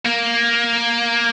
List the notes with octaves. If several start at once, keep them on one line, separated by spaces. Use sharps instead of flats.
A#3